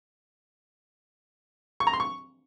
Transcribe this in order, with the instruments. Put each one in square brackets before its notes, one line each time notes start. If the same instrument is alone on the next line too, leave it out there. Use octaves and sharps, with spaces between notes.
[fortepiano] C#6
A#5
C6
C#6